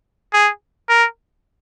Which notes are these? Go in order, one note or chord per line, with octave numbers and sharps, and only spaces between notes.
G#4
A#4